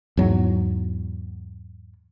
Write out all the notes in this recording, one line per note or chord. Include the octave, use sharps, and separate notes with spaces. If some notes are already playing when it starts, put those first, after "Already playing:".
E2 G#2 F#3